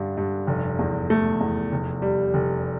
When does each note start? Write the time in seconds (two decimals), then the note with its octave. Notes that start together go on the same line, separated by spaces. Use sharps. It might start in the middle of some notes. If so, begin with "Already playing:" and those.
Already playing: G2 D3
0.17 G2
0.47 F1
0.79 E2
1.10 A3
1.41 E2
1.72 F1
2.02 G3
2.34 F1